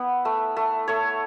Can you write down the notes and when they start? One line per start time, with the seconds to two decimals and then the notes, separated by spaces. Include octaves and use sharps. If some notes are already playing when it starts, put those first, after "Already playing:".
Already playing: B3 E4 B4
0.25 A3
0.57 A3
0.88 A3 C#5